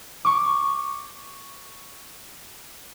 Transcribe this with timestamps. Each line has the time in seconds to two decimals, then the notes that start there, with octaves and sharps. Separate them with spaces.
0.25 C#6 D6